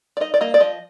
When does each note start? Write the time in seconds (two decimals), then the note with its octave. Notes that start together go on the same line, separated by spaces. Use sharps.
0.17 D5
0.20 D#4 D#5
0.34 D5
0.41 A#3 D#5
0.54 D5
0.60 F3 D#5